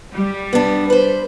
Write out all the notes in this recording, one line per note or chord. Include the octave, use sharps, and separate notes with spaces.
G3
B3 D4
B4 C5